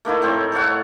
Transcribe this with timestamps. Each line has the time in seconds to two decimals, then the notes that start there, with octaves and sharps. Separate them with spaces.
0.05 A3 A#3 D#4 E4
0.22 A2 C4 C5 C#5
0.52 A4 C#5 F5 F#5